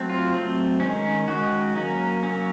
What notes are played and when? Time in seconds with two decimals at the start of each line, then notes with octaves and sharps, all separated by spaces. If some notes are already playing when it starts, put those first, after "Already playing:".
Already playing: F#3 A3 C4
0.09 F4
0.32 F#3 A3 C4
0.80 D#3 G#3 C#4
1.28 D#3 G#3 C#4 F#4
1.75 F#3 A#3 C#4
2.23 F#3 A#3 C#4